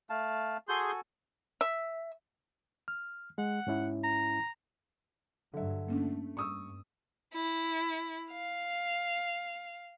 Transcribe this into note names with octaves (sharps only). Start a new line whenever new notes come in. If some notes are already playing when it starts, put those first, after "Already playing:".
A3 F5 A5
F#4 G#4 A4 G#5 C6 G6
E5
F6
G#3 F#5
G#2 C#4 E4
A#5
G2 D3 F#3 E5
A3 A#3 C#4 D4
G2 C#6 D#6 E6
E4
F5